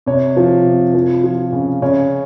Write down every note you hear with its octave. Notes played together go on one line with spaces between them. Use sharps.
C3 C#5
F3
C3
F3
F3
C#3
C#3 C#5